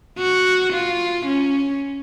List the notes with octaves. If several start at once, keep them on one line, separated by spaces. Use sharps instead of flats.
F#4
F4
C#4